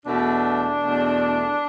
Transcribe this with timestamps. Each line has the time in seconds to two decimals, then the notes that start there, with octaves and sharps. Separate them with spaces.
0.05 E2 B2 A3 D4
0.81 E2 B2 A3